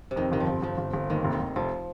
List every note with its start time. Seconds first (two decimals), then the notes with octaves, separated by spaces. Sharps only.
0.11 C3
0.16 F2 D#3
0.32 G1 D#3
0.40 F3
0.47 G1
0.62 G1 F3
0.78 G1
0.94 G1
1.10 D#2 D#3
1.25 F1
1.33 D#3
1.40 F1
1.56 F1 F3